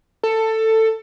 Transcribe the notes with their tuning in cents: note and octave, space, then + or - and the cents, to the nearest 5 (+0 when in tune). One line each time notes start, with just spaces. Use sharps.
A4 +15